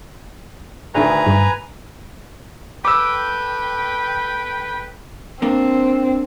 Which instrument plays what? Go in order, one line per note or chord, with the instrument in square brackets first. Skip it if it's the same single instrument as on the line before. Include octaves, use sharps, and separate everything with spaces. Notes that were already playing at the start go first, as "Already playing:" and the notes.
[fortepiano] D2 D#3 [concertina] B4 G#5 A#5
[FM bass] G2
[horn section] A4 B4 G5 [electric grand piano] D6 E6
[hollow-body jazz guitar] A#3 D4 [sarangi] C4